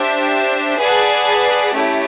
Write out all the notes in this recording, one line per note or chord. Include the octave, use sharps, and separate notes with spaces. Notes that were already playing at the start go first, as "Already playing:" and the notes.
Already playing: D4 G4 C5 E5
G#4 B4 D5 F#5 A5
A3 C#4 E4 G4